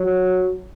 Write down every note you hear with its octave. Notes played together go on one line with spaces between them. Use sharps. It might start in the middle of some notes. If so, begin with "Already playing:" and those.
Already playing: F#3